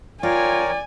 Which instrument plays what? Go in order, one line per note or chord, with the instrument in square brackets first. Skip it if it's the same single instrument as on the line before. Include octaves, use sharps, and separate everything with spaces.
[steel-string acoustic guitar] F4 [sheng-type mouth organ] A#4 C#5 G5 [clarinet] D5 [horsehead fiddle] G#5